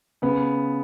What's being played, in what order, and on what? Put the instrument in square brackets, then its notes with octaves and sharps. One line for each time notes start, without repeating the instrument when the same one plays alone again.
[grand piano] C#3 B3